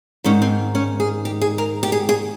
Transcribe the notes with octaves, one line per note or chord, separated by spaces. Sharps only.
G#2 D#3 C#4
C4
C#4
G#4
G4
G#4
A#4
G4
G#4
G#4